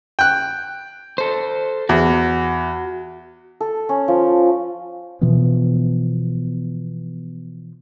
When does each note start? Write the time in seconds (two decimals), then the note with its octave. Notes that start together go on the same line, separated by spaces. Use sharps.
0.19 G5 F#6
1.18 A4 C5
1.89 E2 F#4
3.61 A4
3.89 C#4
4.08 F3
5.21 B2 E3 F3 B3